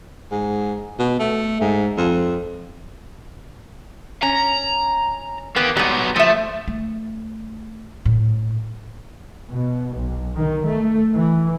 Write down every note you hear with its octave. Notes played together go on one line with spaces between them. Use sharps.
G#2
B2
A3
G#2
F2
C#4 A#5
A#3 B3 G4
G#2 F#3 G3 B3
F3 A3 E5
A3
A2
B2
B1
D#3
A3
E3